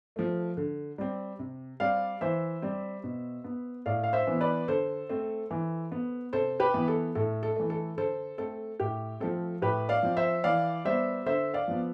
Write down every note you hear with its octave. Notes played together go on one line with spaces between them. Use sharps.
F3 A3
D3
G3 C4
C3
G3 C4 D5 F5
E3 C5 E5
G3 C4
B2
B3
A2 D5 F5
F5
C5 E5
E3 B3
B4 D5
D3 A4 C5
A3 C4
E3
B3
C3 A4 C5
G4 B4
E3 B3
A4
A2 A4
A4
E3 A3
A4
D3 A4 C5
A3 C4 A4
A2 G4
F3 A3 C4 A4
A2 G4 B4
D5 F5
F3 C4
C5 E5
E3 D5 F5
G3 B3 C5 E5
D3 C5 E5
D5 F5
F3 B3